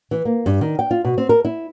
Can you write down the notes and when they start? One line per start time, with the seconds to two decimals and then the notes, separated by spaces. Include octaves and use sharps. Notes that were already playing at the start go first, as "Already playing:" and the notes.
0.11 E3
0.25 A#3
0.46 G2
0.61 D#3
0.79 G5
0.91 F4
1.05 B2
1.18 C4
1.29 A#4
1.45 E4